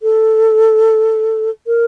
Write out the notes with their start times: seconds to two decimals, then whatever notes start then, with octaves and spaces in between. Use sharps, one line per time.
0.02 A4
1.67 A#4